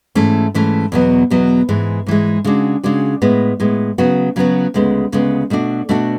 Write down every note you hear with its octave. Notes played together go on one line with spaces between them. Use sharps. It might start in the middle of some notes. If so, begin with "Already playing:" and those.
G#2 E3 A3 C#4
G#2 E3 A3 C#4
E2 B2 F#3 B3
E2 B2 F#3 B3
G#2 E3 G#3
G#2 E3 G#3
C#3 G#3 D4 F#4
C#3 G#3 D4 F#4
A2 G#3 B3
A2 G#3 B3
C#3 F#3 B3 F#4
C#3 F#3 B3 F#4
D2 C#3 G#3 B3
D2 C#3 G#3 B3
B2 A3 D4 F#4
B2 A3 D4 F#4